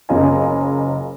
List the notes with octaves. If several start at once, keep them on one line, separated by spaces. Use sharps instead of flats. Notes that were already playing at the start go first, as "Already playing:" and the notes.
F#1 C#3 F4 D#5 F5 G#5